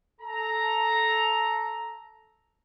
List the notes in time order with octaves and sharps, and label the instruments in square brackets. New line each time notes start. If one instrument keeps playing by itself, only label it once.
[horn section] A4 A#5